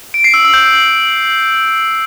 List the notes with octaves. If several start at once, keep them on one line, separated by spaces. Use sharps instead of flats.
D7
C7
E6
E6
G6